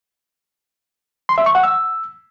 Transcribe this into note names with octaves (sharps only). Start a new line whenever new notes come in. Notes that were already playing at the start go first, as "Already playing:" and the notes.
C6
E5
C#6
F#5
E6